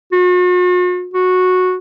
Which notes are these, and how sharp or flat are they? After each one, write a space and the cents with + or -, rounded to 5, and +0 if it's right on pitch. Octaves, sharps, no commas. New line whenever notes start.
F#4 -45
F#4 -10